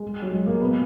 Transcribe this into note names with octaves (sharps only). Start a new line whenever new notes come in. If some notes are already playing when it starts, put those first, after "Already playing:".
Already playing: G#3
F#3
G#3
A#3
B3